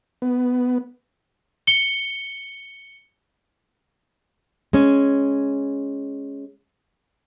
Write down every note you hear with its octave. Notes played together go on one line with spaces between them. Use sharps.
B3
C#7 G7
G#3 C#4